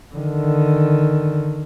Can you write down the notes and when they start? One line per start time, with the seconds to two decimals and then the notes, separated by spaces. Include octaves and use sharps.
0.15 D3 D#3